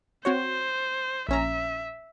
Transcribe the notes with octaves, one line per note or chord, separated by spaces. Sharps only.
C4 F#4 C5 C#5
A#1 C#4 E5 A#5